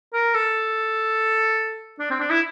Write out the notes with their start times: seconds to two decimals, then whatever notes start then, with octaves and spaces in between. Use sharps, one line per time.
0.14 A#4
0.34 A4
1.99 D4
2.11 C4
2.20 D4
2.30 E4